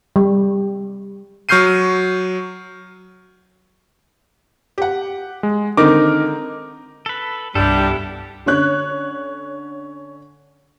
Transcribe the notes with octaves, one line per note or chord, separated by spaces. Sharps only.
G3
F#3 C#6 F6 G6 C7 D#7
G4 F#5
G#3
D3 D#3 C4 D#4 A#4 D6
A4 B4
C2 G2 G3 B3 D4 E4 G4 A4
D3 C#4 C#5 F#6